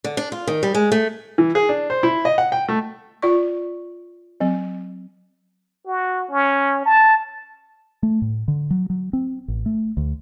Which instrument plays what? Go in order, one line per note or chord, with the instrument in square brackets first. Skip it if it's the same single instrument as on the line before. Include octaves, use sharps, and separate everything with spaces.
[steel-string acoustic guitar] D3
D4
F4
D#3
G3
G#3
A3
[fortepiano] E3
G#4
D4
C5
E4
D#5
F#5
G5
A3
[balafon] F4 D5 C#6
F#3 C4
[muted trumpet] F#4
C#4
A5
[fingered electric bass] A3
A2
D3
F#3
F#3
C4
A1
A3
D2